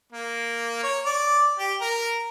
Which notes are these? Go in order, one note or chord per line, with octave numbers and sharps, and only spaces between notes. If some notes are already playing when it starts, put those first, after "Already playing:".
A#3
C#5
D5
G4
A#4